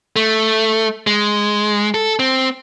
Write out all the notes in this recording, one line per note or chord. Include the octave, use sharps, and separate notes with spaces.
A3
G#3
A4
C4